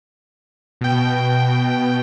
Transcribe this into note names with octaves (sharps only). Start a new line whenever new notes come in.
B2 G5